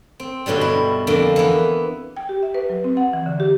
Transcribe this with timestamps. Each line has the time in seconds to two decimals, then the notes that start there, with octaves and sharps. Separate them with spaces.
0.20 C4
0.46 G2 B2 D3 F#3 G3
0.61 E4
1.07 F2 D3 A#3 B5
1.36 E3 B3
2.17 G5
2.29 G4
2.43 E5
2.54 B4
2.70 F#3
2.84 C4
2.97 F#5
3.13 E3
3.26 D3
3.40 G4